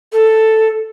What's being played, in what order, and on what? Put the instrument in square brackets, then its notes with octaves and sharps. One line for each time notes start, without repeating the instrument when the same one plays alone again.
[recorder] A4